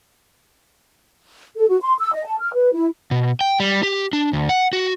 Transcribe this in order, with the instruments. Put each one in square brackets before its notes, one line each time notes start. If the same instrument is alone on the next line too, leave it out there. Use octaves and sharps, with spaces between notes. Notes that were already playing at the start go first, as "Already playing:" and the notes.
[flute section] A4
F#4
C6
E6
D#5
A5
F6
B4
E4
[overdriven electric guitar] B2
G5
G3
G4
D4
D2
F#5
F#4